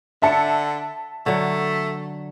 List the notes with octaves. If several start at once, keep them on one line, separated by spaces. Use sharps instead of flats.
D3 E5 A5 C#7
D3 F#3 A3